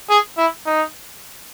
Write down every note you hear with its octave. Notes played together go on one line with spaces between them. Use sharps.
G#4
E4
D#4